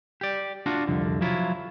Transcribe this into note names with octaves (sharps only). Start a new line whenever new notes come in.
G4 D5
D4 F4 F#4
C2 F2 D3
F3 F#3 E4 F4